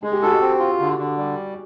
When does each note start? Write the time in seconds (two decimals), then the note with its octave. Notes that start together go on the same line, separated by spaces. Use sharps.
0.03 G#3 G#4
0.12 G4
0.22 F#4 A4
0.32 G4
0.40 C4
0.59 F4
0.80 D3
0.98 D3
1.17 G3